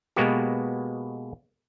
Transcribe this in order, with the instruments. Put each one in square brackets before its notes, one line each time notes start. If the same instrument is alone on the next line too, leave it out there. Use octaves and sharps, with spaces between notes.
[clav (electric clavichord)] B2 G#3 A#3 B3 F#4 G4